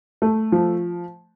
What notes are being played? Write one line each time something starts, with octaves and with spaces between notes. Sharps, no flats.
A3
F3